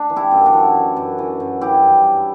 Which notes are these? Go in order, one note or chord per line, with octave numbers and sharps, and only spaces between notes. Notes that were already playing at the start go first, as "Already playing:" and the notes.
Already playing: D4
E3
E4 G4
F#2
D4 F#4
E3
E3
F#2
E3
F#2
E3 E4 G4
G2
G2